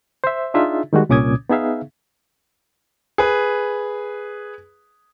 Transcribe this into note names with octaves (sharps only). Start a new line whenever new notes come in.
C5 E5
D4 D#4 F4 G#4 E5
D#3 G3 G#3 F#4
C2 A#2 C#4 D6 D#6 G#6
B3 D#4 G#4 E5 F5
G#4 B4